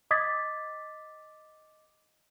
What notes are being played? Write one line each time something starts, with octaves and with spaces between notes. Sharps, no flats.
D#5 D6 D#6 G#6 A6 B6